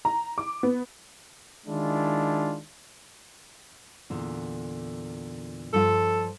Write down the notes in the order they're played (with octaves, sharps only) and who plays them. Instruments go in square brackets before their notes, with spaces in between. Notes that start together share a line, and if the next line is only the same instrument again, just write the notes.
[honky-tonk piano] A#5
D6
B3
[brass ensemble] D#3 G#3 D4 E4 F4
[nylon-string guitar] E2 A#2 D3
[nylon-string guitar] G2 F3 F4 [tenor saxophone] A4